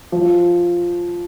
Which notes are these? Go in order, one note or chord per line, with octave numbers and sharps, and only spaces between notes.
F3